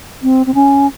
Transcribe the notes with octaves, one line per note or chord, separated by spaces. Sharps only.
C4
C4
C#4